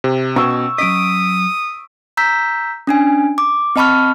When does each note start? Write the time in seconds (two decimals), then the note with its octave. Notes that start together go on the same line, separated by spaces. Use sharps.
0.04 C3
0.36 B2 C#4 F5 G5 C#6 E6
0.78 F#3 C#4 D#5 D#6 B6 D7
2.17 A#5 E6 G6 B6
2.87 C#4 D4 G#5
3.38 D6
3.76 C4 D#5 A5 B5 C#6 F6